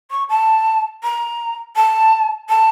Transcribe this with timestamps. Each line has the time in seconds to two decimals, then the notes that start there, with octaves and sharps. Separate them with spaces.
0.11 C#6
0.29 A5
1.03 A#5
1.76 A5
2.49 A5